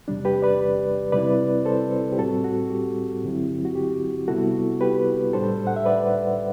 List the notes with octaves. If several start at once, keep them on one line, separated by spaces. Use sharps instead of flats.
E2 C3 G3 D4
G4 B4
B4 D5
C3 G3 C4 E4 B4 D5
A4 C5
G4
A2 G3 C4 F#4 A4
F#4
G4
G2 D3 F#3 C4 E4
F#4
G4
C3 G3 B3 E4 F#4 A4
G4 B4
A2 G3 D4 A4 C5
F#5
E5
B4 D5